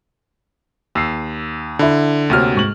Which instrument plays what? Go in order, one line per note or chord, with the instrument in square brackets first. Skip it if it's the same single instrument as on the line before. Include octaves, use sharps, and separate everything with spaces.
[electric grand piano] D#2 [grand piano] E6 C7
[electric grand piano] D3 [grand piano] E4 B5
[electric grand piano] D2 C3 F6 [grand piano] A#3 F#4 C#5
[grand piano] G#2 C#6 F#7